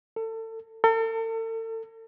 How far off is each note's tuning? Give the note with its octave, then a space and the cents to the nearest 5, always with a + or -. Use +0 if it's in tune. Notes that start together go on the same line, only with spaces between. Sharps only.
A4 +30
A4 +40